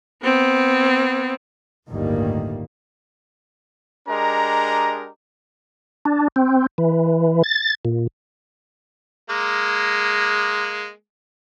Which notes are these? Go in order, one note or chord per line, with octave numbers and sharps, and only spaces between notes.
B3 C4
G1 D2 A2 D#3 G3 A#3
G#3 D4 G4 A#4 D#5 A#5
D4
C4
E3
A6
A#2
G#3 A#3